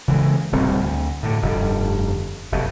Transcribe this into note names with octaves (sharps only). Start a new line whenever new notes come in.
C#3 E3 G3 G#3
D1 C2 C4
D2
A2 D3
F1 G2 D3
F1 F#2 B2